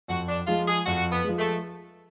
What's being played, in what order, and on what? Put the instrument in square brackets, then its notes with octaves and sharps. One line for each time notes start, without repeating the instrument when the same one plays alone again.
[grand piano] F2 [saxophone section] F#4
[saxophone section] D4
[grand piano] F3 G#3 [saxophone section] F4
[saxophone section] G#4
[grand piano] F2 [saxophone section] F#4
[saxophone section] B3
[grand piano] F3 G#3
[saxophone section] A3